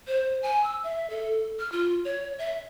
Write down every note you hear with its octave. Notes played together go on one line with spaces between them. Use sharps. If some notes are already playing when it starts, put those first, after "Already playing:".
C5
G#5
E6
E5
A4
F6
F4
C#5
E5